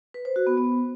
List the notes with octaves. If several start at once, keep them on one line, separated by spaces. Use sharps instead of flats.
B4
C5
F#4
B3
B3